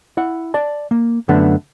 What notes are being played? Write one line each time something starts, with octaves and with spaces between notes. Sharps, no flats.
E4 F#5
D5 A5
A#3
F#2 D3 A3 B3 D4